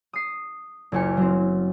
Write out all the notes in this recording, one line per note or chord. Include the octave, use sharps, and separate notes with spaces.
D#6 C7
F#1 C#2 E4 G#5 C#7
F#3 C4